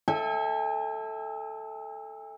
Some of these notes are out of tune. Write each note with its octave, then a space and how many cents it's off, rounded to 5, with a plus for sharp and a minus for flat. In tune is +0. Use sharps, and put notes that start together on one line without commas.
A4 +0 E5 -35 G#5 -45